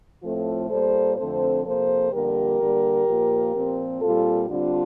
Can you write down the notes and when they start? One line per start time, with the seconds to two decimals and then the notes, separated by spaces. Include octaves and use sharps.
0.23 A2 F3 A3 C4 F4 A4
0.70 A#2 G3 A#3 A4 C5
1.17 F2 D3 A3 C4 A4 C5
1.64 C3 F3 A#3 A4 C5
2.12 F2 D3 G3 A#3 G4 A#4
2.59 D3 G3 A#3
3.06 A#2 F3 A#3
3.53 A#2 F3 C4
4.01 A#2 G3 C4 F4 A4
4.48 D3 G3 C4 D4 F4